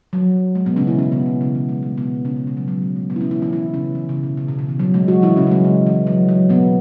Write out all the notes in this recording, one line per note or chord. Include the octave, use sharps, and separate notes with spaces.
F#3
G#3
B2 B3
C#3 C#4
E3 E4
C#3 C#4
B2 B3
E3
C#3
E3
G#3
G#3
B2 B3
C#3 C#4
G#3
C#3
F#3
F#3
G#3
G#3
B2 B3
E4
C#3 C#4
E3 E4
E3 E4
E3 E4
C#3 C#4
E3
C#3
B2
C#3
B2
C#3
E3
F#3
G#3
F#3 F#4
E3 E4
C#3 C#4
F#3
G#3
C#3
E3
F#3
F#3
B2 B3